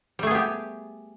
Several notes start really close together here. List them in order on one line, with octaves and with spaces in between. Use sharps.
G3 A3 G#4 B3 G4